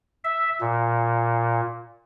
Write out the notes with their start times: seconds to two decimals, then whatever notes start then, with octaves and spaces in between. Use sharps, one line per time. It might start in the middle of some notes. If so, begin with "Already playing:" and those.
0.24 E5
0.61 A#2